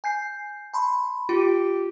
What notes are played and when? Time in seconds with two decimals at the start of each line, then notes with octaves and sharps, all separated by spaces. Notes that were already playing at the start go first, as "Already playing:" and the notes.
0.04 G#5 G6 C7
0.74 A5 B5 C6
1.29 F4 G4